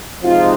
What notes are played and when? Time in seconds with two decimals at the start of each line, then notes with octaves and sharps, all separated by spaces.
0.22 C3 F3 G#3 C4 D#4 F4